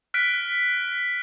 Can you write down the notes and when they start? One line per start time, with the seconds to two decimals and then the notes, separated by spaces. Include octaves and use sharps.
0.14 F6 F#6 B6 D7